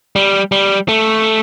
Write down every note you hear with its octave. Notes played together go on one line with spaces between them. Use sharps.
G3
G3
A3